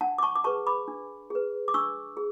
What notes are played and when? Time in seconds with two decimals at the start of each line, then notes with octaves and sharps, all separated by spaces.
0.01 D4 F#5 A5
0.18 D6
0.23 A5 C#6
0.35 D6
0.44 G#4 B4 A5 C#6
0.67 B5 D6
0.88 D4
1.30 G#4 B4
1.68 D6
1.74 D4 C#6 E6
2.17 G#4